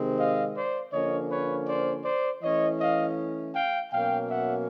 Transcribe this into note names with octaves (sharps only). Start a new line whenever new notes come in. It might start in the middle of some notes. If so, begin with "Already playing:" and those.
Already playing: C3 D#3 G#3 C4
D#5 F5
C5 D5
D3 F3 A#3 C#4 C#5 D#5
B4 C#5
C5 D5
C5 D5
E3 A3 C#4 C#5 D#5
D#5 F5
F5 G5
B2 F#3 A#3 C#4 F5 G5
E5 F#5